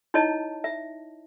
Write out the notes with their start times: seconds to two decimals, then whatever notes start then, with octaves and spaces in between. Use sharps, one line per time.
0.14 D#4 E4 C#5 D#5 A5
0.64 E5